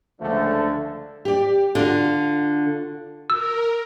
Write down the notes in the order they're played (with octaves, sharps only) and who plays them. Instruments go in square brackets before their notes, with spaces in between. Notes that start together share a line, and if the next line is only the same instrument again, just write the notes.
[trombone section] C#2 F3 A3 [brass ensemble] D3
[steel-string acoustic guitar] G4 D5
[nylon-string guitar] D3 [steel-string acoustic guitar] F4 F#4
[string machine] A#4 [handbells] E6